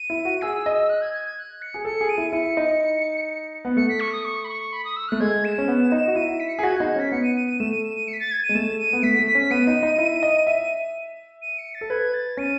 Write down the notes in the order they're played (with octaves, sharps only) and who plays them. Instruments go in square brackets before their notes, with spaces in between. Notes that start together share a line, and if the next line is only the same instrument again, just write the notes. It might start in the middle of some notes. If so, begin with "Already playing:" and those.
Already playing: [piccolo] D#7
[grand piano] E4
F#4
[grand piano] G#4 [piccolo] E6
[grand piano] D#5
[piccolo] F#6
G#6
G#6
G#6
F#6
C#7
[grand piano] G#4
[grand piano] A4 [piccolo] C#7
[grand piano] G#4
[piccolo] D#7
[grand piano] E4
[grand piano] E4 [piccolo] C#7
[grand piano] D#4
B3
[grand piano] A3 [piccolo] C#7
[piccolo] B6
C#6
D#6
C#6
B5
C#6
B5
D#6
E6
[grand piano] A3 [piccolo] F#6
[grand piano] G#3 [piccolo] G#6
[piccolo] E7
[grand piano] C#4
B3
D#4
F#4
[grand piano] E4 [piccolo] D#7
[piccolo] B6
C#7
[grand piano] G#4 [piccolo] B6
[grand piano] F#4 [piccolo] G#6
[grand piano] D#4 [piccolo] F#6
[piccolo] G#6
[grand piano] C#4 [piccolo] B6
[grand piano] B3 [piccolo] C#7
[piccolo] D#7
D#7
D#7
[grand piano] A3 [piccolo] E7
[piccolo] D#7
E7
D#7
C#7
B6
A6
G#6
D#7
[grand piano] G#3
[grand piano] A3 [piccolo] E7
[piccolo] D#7
[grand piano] B3
[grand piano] A3 [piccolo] B6
[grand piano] A3
[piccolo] B6
[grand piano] C#4
[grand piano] B3 [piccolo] D#7
[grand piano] D#4
D#4
E4
D#5
[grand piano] E5 [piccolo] D#7
[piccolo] D#7
C#7
A6
[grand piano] A4
[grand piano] B4 [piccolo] G#6
[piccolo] A6
[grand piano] C#4 [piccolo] D#7